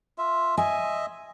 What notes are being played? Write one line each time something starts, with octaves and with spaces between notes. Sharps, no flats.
F4 E5
D#5 E5 G#5